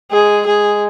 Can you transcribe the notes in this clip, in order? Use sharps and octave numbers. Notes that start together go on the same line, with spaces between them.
G#3 G#4
G#3 G#4